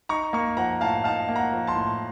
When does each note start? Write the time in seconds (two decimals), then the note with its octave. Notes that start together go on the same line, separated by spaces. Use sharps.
0.09 D#4 A#5 C#6
0.33 A#3 A#5 C#6
0.57 F3 F#5 A#5
0.81 A2 F5 A5
1.04 D#4 F5 A5
1.29 A#3
1.36 F#5 A#5
1.53 F3
1.67 A5 C6
1.75 A2